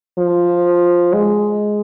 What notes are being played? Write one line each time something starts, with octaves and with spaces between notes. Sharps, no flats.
F3
G#3